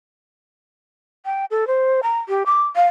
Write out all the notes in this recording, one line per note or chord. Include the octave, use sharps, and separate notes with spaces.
G5
A4
C5
A#5
G4
D6
F5